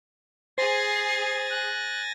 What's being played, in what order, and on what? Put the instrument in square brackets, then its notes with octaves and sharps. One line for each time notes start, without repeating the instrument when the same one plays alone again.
[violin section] G#4 [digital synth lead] C5 [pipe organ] G#5 A6 A#6 [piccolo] C7
[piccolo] F#6